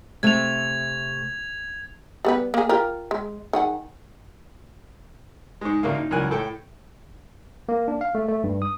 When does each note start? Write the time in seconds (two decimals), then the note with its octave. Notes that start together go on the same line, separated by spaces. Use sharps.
0.23 C3 A3 E5 G#6 F7
2.25 G3 B3 B4
2.54 A#3 G#4
2.69 F4 G4 A#4
3.11 G#3
3.53 D#3 G#4 F#5
5.61 G#2 G#3
5.83 A1 D2 A#3
5.95 D#4
6.11 C#2 F#2 E3 A#4 G#5 F#6
6.31 A2 A4 G5
7.69 A#3
7.88 D4
8.01 F5
8.15 A3
8.28 A3
8.44 G2
8.62 D#6